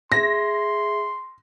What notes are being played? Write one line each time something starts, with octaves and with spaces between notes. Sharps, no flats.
G#4 E5 C6 A#6